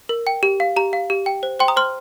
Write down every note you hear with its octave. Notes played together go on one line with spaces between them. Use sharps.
A#4
G5
G4
F5
G4 A#5
F5
G4
G5
C5
C5 G5 C6
A#5 D#6
C5 C6 F6